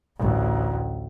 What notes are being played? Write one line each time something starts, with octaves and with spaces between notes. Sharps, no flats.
A1 D2